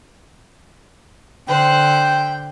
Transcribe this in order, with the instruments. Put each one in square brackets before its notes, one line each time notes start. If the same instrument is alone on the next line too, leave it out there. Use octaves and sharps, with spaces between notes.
[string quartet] D3 C5 F#6 [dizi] G5